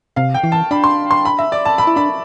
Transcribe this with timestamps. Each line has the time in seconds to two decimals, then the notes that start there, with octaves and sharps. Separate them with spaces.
0.16 C3 F5
0.34 G5
0.44 E3
0.52 A5
0.71 D4 B5
0.84 C6
1.11 C6
1.25 B5
1.39 E5
1.52 D5
1.65 A5
1.78 B5
1.87 E4
1.96 D4 B5